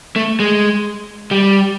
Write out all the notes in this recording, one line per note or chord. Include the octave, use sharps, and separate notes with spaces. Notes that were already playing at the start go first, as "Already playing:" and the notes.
A3
G#3
G3